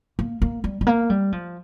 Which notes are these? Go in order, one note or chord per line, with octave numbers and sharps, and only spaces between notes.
A#3
A#3
G3
G3
A#3
G3
F3